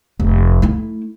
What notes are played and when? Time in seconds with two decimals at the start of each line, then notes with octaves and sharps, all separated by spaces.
0.20 F1
0.62 A3 E4